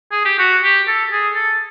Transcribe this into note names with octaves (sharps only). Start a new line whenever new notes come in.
G#4
G4
F#4
G4
A4
G#4
A4